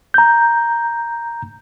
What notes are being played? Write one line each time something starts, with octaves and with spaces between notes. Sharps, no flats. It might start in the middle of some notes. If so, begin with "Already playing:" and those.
A#5 G6